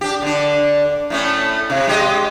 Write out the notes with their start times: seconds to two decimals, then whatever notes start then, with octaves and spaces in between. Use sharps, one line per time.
0.01 D4 G4
0.22 D3 D4
1.10 A2 A3 C#4
1.70 C3
1.87 G#3 G4 D#5